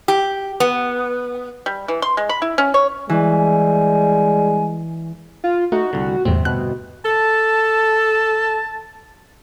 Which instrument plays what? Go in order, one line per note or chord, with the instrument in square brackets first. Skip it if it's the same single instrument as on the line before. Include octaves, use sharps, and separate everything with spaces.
[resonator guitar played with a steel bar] G4
B3
[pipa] G3
E3
C6
G#3
B5
E4
C#4
C#5
[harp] E3 [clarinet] G3 [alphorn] G#3 [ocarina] G#5
[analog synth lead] F4
[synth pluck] A3 [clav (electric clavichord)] D#4 [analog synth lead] F#4
[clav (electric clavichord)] C2 D3
[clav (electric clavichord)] G1 C3 C4 [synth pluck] E2 A2
[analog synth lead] B2 [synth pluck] F#6
[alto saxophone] A4 [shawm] A5